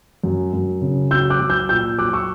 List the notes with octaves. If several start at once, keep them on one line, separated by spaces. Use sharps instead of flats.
F#2
F#2
C#3
F#3 E6 G6
D6 F#6
F#3
E6 G6
A#2 E6 G6
F#3 D6 F#6
C#6 E6